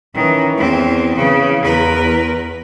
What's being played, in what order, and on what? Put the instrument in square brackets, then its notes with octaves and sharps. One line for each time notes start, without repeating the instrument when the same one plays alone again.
[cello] D#3 [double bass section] E3 C#4
[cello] E2 C4
[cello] C#3 [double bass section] E3
[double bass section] E2 [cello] A#4 B4